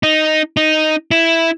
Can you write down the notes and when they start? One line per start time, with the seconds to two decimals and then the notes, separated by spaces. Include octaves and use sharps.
0.03 D#4
0.57 D#4
1.11 E4